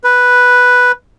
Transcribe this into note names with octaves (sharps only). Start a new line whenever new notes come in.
B4